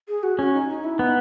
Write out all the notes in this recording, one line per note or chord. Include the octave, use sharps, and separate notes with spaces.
G#4
F#4
C#4 F#4
D#4
D#4
E4
B3 D#4